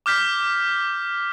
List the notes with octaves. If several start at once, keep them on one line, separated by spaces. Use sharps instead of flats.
D6 F6 G6 B6